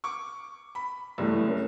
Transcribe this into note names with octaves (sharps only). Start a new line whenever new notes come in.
C#6 D6
B5
F#1 C2 G2 E3 A3
C#4 A#4